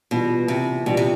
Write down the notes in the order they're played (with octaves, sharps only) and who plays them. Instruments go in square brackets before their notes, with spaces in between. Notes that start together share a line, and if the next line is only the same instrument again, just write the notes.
[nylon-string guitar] B2 [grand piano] E3 G3 D4 F4
[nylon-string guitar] C3
[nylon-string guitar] B2 [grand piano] E3 G3 D4 F4
[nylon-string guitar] C3